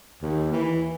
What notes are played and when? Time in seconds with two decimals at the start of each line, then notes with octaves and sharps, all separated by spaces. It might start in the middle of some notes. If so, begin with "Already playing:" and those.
0.22 D#2
0.52 E3